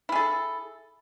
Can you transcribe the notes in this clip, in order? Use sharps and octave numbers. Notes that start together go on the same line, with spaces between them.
E4 G#4 A4